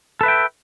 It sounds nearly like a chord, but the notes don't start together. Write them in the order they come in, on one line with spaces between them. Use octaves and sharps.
A4 B4 E5 G5